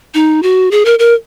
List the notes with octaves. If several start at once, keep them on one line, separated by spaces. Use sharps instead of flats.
D#4
F#4
G#4
A#4
A#4